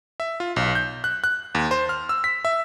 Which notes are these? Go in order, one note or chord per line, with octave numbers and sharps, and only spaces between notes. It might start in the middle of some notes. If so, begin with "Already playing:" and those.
E5
F4
B1
G6
F#6
F#6
D#2
C5
F6
E6
B6
E5